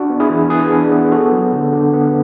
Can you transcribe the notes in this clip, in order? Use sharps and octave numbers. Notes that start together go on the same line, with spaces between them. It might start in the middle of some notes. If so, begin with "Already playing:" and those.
Already playing: D4 F#4
B3
E4 G#4
E3
E3 G#4 B4
D4
B3
B3 F#4 A4
F#3
D3
D3
B3